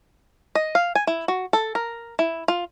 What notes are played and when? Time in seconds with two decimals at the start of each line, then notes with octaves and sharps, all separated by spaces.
0.55 D#5
0.75 F5
0.95 G#5
1.07 E4
1.28 F#4
1.53 A4
1.75 A#4
2.19 E4
2.48 F4